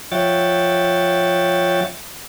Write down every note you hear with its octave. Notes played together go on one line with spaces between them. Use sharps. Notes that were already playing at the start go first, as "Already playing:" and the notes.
F3 C#5 E5 F#5 G5 A6